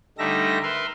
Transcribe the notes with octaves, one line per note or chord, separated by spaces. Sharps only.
D3 G3 A3 D#4 E5 A#6
A#4 B4 E5 C6